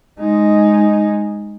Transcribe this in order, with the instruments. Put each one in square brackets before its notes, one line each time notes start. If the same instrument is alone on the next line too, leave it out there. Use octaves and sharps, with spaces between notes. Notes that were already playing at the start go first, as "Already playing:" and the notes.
[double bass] G#3 D#4